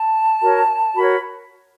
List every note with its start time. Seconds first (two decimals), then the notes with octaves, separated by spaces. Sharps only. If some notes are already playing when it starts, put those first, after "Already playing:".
Already playing: A5
0.42 F#4 A#4 C#5
0.96 F#4 A#4 C#5 B5